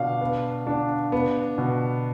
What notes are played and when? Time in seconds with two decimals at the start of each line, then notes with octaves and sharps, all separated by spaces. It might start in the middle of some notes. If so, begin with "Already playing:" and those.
Already playing: B2 D4 F5
0.21 B3
0.67 D4
1.12 B3
1.58 B2